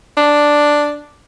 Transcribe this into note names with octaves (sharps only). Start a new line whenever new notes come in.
D4